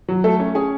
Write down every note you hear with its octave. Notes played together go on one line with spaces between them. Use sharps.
F#3
A3 A4
C#4
C#4 G#4